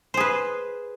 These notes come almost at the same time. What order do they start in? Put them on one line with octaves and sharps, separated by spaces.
C5 G#4 B4